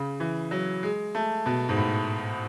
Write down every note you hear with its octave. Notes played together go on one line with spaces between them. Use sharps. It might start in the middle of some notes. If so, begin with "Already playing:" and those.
Already playing: C#3
E3
F#3
G#3
A3
B2
G#2
A2